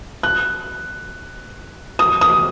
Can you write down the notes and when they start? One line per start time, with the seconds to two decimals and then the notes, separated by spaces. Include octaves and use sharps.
0.23 F#6
1.99 D#6
2.21 D#6